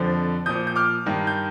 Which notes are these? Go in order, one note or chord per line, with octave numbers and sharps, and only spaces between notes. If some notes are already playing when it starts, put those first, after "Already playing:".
Already playing: F2 D3 F3
A#2 F3 D#6 G6
G6
D6 F6
G2 D#3
G6